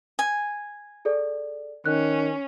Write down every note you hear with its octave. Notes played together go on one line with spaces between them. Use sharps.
G#5
G#4 A4 D5
D#3 C#4 F#6